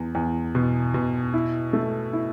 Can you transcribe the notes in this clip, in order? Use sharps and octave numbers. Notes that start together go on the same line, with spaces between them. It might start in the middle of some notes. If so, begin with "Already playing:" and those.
Already playing: E2
E2
B2
B2
E4
A3
E4